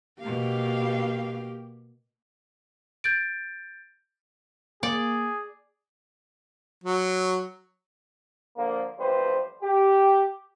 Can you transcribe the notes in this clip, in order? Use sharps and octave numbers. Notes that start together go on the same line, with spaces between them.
B2 A#3 G4 F5
G6 A6 D7
A#3 G#4 D5
F#3
D3 F3 A#3
A1 F2 G3 B4 C5
G4